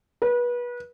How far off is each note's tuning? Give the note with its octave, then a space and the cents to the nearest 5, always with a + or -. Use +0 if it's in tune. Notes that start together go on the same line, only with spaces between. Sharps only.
B4 -30